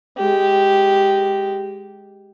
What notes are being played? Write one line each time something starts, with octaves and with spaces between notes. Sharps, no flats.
G#3 G4